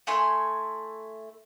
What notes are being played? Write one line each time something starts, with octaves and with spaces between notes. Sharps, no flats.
A3 E4 G#5 C6